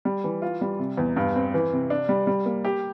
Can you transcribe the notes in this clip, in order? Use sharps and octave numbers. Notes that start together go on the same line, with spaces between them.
G3
E3
F4
G3
C3
E2
G2
C4
E3
C3
D4
G3
G3
A#3
G4